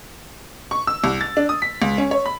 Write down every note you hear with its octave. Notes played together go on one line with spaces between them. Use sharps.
C#6
E6
C2
A6
D4
D#6
B6
C#2
C#4
C#5
B5